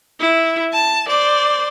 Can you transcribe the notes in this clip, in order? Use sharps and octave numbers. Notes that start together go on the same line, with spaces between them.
E4
A5
C5 D5